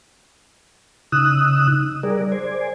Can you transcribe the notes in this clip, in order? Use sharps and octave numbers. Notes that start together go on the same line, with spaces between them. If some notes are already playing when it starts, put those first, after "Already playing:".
C#3 D#4 D#6 E6 F#6
G3 G#4 A#4 D5
C5 D5 G#5